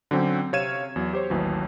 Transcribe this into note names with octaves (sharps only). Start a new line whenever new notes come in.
D3 F#3 C4 C#4 G5
C3 C#5 F5 G#6 D#7 E7
E2 F#3
G4 C5 C#5
A1 D#2 E3 F#3